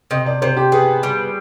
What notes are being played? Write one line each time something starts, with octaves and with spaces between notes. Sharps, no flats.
C3 D#5
D5
C3 C5
G4
B3 G#4
G3